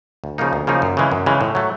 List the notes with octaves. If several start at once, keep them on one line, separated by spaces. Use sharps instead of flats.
D2
C#3 F3 A#3 D#4
D2
C#3 F3 A#3 D#4
F#2
C#3 E3 G#3
F#2
C#3 E3 G#3
A2
F#3 A3